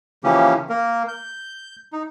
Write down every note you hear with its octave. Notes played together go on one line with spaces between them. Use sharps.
C#3 E3 F3 A#3 C#4 G4
A#3 A#4
G6
D#4